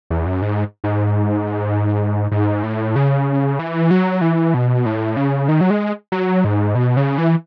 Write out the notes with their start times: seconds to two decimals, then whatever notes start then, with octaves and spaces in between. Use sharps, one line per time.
0.10 E2
0.26 F#2
0.42 G#2
0.84 G#2
2.31 G#2
2.63 A2
2.96 C#3
3.59 E3
3.91 F#3
4.21 E3
4.54 B2
4.86 A2
5.17 C#3
5.49 D#3
5.61 F#3
5.70 G#3
6.12 F#3
6.44 G#2
6.75 B2
6.97 C#3
7.18 E3